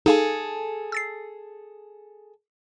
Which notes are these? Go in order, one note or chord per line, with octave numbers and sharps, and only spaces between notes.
D#4 G#4 A4 F5 G#5
E6 A6 C7